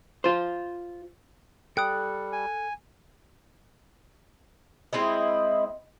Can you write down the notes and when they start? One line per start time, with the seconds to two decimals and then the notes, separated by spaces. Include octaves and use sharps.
0.24 F4 C5
1.77 G3 A4 G5 D#6 F#6
2.32 G#5
4.93 G#3 C4 E4 D#5